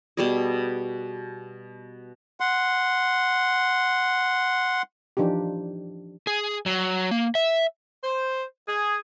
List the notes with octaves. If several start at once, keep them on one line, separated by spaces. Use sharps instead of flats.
B2 G3 G#4
F#5 C6
E3 F3 D4 D#4 G4
G#4
F#3
A#3
E5
C5
G#4